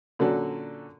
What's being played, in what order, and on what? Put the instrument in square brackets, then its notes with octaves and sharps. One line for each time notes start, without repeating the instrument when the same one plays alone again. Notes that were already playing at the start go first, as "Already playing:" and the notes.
[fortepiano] A#2 D3 F#3 C#4 F#4 A4